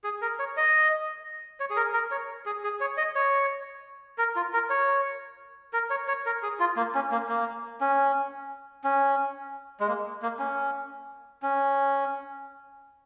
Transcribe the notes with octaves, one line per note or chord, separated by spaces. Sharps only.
G#4
A#4
C#5
D#5
C#5
G#4
A#4
A#4
C#5
G#4
G#4
C#5
D#5
C#5
A#4
F4
A#4
C#5
A#4
C#5
C#5
A#4
G#4
F4
A#3
C#4
A#3
A#3
C#4
C#4
G#3
A#3
A#3
C#4
C#4